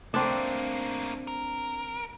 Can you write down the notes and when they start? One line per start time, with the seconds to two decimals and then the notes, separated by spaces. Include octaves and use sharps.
0.14 A3 A#3 C4 D4
1.27 A#4